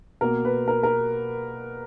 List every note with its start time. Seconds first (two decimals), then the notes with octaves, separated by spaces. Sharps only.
0.21 B2 A#3 A#4
0.45 B4
0.68 A#4
0.83 A#4